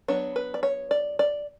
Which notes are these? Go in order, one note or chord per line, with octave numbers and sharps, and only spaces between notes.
F#3 B3 D4 C#5
B4
D5
C#5
D5
D5